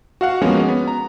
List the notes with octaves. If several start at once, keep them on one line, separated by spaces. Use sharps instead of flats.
F#4 F5 F#5
F3 G#3 A#3 B3 C#4 F#4
B3
A#5